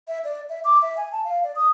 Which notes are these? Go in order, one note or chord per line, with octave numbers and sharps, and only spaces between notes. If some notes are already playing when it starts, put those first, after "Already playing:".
E5
D5
E5
D6
E5
G#5
A5
F5
D5
D#6